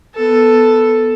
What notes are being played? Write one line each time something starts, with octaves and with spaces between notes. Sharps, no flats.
B3 A4